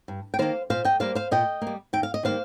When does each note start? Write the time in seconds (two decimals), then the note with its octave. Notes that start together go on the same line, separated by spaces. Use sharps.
0.08 G2
0.34 G5
0.39 D#3 A#3 C5 F5
0.70 A#2 C5 F5
0.85 D#5 G5
1.00 G3 A#3 C5 F5
1.15 C5 F5
1.31 A#2 D#5 G5
1.62 A#3
1.67 G3
1.93 D#2 G5
2.03 F5
2.14 D#5
2.23 D#3 G3 A#3 C5 F5